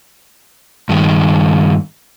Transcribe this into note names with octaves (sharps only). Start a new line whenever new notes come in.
G2 D#3